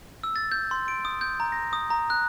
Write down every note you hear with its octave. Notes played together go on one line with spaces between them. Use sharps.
E6
A6
G6
C6
D7
D#6
G6
A#5
A#6
D#6
A#5
F#6